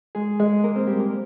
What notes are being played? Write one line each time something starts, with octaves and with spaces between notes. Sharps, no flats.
G#3 G#4
G#3 G#4
A#3 A#4
C4 C5
G3 G4
A#3 A#4